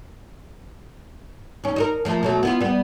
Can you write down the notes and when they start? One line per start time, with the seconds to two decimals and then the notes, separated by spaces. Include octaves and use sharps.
1.64 D#2 C#4
1.76 D#4 F4 A#4
2.05 F3 A3 A#3
2.23 B2 F#3 A3
2.43 B3 E4 F4
2.61 G3 B3